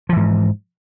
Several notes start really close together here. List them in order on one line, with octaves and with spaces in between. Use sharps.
F3 E3 G#2